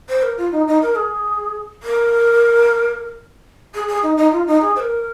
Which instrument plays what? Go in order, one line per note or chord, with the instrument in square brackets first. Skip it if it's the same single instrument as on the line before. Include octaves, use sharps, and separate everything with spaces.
[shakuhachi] C5
A#4
F4
D#4
D#4
A#4
G#4
A#4
G#4
G#4
D#4
D#4
F4
D#4
G#4
C5
A#4